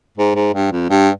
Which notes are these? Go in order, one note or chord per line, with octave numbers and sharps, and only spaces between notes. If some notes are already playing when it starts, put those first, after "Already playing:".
G#2
G#2
G2
F2
G2